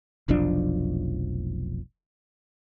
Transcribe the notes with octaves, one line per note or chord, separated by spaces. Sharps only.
F1 B1 F3 D4